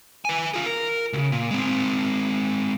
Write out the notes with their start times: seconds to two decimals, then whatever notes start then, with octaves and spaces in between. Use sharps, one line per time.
0.25 B4 G#5
0.54 F4 G#4
0.66 A#4
1.13 C#2 C#3
1.32 A#2
1.51 G#3 C4